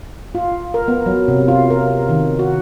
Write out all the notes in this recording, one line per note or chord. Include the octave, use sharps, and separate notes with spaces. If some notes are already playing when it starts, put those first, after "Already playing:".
F4
A#4
B3
F#3
C3
F4
A#4
D#3
F#4